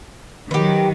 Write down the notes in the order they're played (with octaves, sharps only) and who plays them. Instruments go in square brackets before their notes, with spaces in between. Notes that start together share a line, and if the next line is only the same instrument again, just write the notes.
[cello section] D#3 F#3 [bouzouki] G4 B4